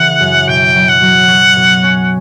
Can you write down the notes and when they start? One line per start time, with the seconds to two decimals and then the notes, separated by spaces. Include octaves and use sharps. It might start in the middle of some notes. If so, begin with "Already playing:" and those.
Already playing: C#3 E3 B3 F#5
0.20 F#2
0.47 B2 G5
0.75 F#3
0.88 F#5
1.02 F#3
1.28 F#3
1.56 B2
1.83 C#4